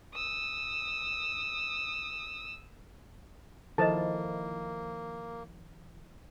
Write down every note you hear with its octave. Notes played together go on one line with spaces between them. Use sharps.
D#6 E6
D#3 F3 A#3 E4 A4 C5 D#5 A5